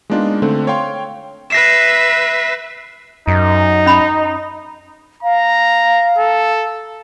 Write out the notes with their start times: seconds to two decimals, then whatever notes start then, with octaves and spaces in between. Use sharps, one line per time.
0.10 G#3 A#3 B3 D4 D#4 F4
0.42 D3 A3 C4
0.67 C#5 F5 G5 C6
1.50 B4 E5 A#6 C7 E7
3.28 F#2 D#4
3.86 C#4 B5
5.23 F5 A#5
6.18 A4